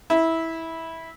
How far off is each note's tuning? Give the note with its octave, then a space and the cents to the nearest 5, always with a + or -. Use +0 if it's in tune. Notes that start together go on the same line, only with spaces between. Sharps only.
E4 -15